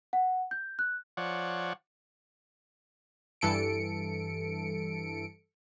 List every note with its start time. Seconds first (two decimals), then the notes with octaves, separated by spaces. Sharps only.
0.13 F#5
0.51 G6
0.79 F#6
1.17 F3 C#5 D5 F#5
3.41 G2 E3 A4 C#7 D7